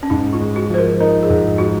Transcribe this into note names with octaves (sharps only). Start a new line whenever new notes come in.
C#4
G#2 D#4
F4
G#3
F#4
F3 C5
A#4
D#4 A#4
G#4
G#2
G#3 F#4